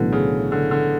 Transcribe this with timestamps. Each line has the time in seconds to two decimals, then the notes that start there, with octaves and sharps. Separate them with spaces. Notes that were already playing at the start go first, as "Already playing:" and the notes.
Already playing: B1 A2 D3 E3 B3
0.12 C#3
0.52 D3
0.71 D3